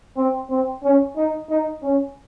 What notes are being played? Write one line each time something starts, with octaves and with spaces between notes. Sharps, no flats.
C4
C4
C#4
D#4
D#4
C#4